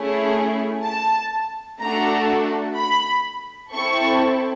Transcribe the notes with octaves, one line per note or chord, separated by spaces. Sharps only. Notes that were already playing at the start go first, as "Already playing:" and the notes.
Already playing: A3 C#4 E4 G#4
A5
A3 D4 F#4 A4 A#5
B5
C4 E4 A4 C#6